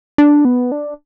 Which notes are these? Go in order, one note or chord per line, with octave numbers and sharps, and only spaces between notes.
D4
B3
D4